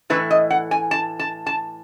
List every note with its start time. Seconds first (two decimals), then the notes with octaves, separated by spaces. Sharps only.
0.10 A2 E3 A3 E4 B4
0.31 D#5
0.50 F#5
0.71 G#5
0.91 A5
1.19 A5
1.46 A5